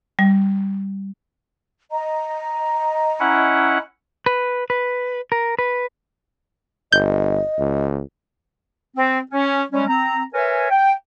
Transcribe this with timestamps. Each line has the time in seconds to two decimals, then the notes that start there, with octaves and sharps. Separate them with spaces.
0.19 G3
1.92 D#5 A#5
3.20 C#4 E4 F#5
4.26 B4
4.70 B4
5.32 A#4
5.59 B4
6.92 G1 D#5 G6
7.59 C#2
8.97 C4
9.31 C#4
9.72 G3 G#3 C#4
9.88 C4 A#5
10.33 A#4 B4 C#5 E5 G#5
10.70 G5